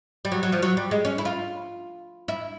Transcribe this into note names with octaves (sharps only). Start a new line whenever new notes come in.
G3
F#3
F#3
F3
F#3
G3
G#3
C#4
E4
F4
E4